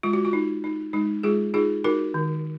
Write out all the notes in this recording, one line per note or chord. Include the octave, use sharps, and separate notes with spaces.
G#3 F4
F#4
F4
D#4
D#4
G#3 D#4
G#3 F4 G#4
D#4 F4 G#4
D#4 F#4 A#4
D#3